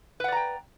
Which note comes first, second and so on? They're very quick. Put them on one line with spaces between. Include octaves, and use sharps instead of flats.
B4 F#5 D5 A#5 G5